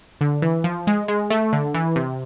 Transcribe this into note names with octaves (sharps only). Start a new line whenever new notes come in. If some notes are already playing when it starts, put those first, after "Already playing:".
D3
E3
F3
G#3
G#3
A3
D3
E3
C3